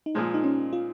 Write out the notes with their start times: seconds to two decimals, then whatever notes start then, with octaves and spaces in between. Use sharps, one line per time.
0.06 D#4
0.15 A#2 F3 G#3 F4
0.34 D#4
0.44 C#4
0.73 F4